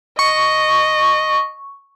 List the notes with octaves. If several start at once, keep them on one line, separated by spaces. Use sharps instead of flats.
D#5 C#6